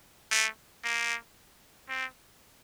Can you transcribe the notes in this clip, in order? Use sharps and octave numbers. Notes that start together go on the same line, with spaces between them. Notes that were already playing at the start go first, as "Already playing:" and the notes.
A3
A#3
C4